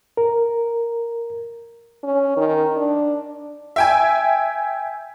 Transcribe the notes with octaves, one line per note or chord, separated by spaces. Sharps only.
A#4
C#4
D#3
D4
E5 G5 G#5